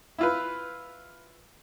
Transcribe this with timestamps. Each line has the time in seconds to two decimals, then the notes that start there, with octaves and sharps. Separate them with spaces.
0.18 E4 F4 B4